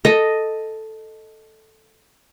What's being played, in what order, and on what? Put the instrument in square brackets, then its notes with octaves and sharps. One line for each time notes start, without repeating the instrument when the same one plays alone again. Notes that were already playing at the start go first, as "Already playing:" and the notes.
[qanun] A4 D#5